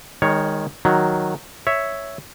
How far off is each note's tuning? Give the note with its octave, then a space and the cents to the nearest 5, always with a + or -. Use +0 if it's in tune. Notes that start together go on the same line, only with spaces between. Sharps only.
D#3 +0 G#3 -35 C#5 +5
D#3 +0 F#3 +0
C#5 +0 E5 +0